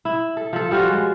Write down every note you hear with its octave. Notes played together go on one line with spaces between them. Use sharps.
E4
A4
F3 A4
F3 G3 F4 F#4
G#3